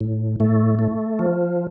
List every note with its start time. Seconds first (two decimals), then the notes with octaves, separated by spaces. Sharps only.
0.01 A2
0.40 A2 A3
0.79 A3
1.19 F3